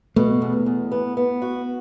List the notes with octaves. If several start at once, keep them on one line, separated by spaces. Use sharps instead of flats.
B2 A3
E2
E2
B3
B3
F#4